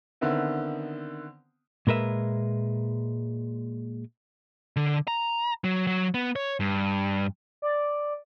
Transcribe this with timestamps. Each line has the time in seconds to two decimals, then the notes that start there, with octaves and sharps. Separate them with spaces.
0.21 D3 D#3 B3 C4 E4
1.87 A#2 G#3 A#4 B4 E5
4.76 D3
5.08 A#5
5.64 F#3
5.87 F#3
6.14 B3
6.36 C#5
6.60 G2
7.62 D5